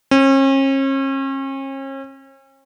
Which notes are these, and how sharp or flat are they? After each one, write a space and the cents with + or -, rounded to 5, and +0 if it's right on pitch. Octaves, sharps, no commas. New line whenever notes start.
C#4 -40